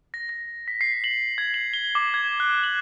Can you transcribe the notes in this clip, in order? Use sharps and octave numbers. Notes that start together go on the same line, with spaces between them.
A#6
A#6
B6
C7
F#7
G#6
F#7
G7
D6
G#6
F#6
F#7